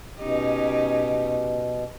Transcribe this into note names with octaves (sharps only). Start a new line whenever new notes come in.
B2 C#4 D#4 G4